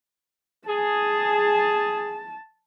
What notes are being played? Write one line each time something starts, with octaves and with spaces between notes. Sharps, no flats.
G#4 A5